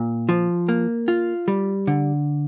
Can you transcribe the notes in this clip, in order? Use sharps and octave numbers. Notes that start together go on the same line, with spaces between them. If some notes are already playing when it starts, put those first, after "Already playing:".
Already playing: A#2
F3
A#3
F4
G3
D3